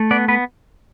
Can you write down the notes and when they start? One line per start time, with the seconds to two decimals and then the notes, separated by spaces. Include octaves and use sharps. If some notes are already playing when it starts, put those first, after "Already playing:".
Already playing: A3
0.11 B3 D5
0.28 B3 B4